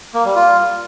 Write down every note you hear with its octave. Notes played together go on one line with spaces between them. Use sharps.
A#3
G3
F4